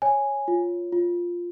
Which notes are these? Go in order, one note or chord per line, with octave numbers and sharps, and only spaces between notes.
C#5 G#5
F4
F4